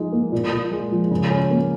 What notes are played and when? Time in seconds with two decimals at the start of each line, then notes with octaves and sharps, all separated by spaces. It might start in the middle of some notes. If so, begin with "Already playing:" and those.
Already playing: F3 G#3 D#4
0.12 A#3
0.32 A#2
0.52 A#2
0.72 G#3
0.92 F3
1.11 C#3
1.30 C#4
1.51 A#3